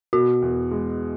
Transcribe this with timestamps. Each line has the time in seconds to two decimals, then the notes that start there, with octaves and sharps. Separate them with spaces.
0.13 B2 F#4
0.42 E2
0.71 G#3